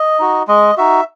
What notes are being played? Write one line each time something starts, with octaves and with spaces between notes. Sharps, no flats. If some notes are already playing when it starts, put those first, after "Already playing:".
Already playing: D#5
D#4 F#4
G#3 D#5
D#4 F#4 E5